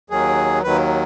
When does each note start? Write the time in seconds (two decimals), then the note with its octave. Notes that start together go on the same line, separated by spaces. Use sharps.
0.10 D#2 D#3 F#3 G#4
0.63 D#2 D#3 F#3 B4